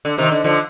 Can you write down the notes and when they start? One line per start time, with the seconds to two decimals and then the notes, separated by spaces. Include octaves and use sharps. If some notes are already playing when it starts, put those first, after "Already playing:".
0.05 D3
0.18 C3 D#3
0.31 D3
0.44 D3 F3